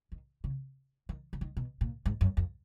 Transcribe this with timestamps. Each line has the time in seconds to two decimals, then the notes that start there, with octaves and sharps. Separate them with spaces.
0.12 D#3
0.44 C#3
1.09 D#3
1.33 C#3
1.41 D#3
1.57 B2
1.81 A#2
2.06 G#2
2.21 F#2
2.37 F2